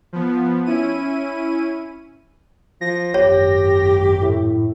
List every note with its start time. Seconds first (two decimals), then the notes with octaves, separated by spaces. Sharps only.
0.13 F3 B3
0.66 C#4 E4 D#7
2.81 F3 A#6
3.14 G#1 F#2 G4 C#5
4.21 A2